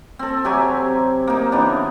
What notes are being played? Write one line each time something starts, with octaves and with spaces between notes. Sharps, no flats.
C4 A4
C3 F#3 G4 G#5
A#3 D#4
C#3 E3 B3 D4